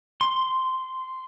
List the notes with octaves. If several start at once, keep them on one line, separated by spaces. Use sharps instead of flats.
C6